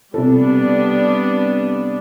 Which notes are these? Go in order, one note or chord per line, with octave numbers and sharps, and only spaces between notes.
C3 G3 B3 D4 A4